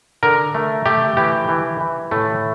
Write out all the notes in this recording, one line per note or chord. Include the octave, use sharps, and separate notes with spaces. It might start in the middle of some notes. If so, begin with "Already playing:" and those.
D3 A#4
A3
A3 G4
E3 G4
E3
E3
A2 A3